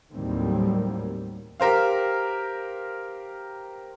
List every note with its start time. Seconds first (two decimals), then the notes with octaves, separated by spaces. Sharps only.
0.13 D#2 A2 D#3 F#3 G3 C4
1.60 G4 A#4 C5 F5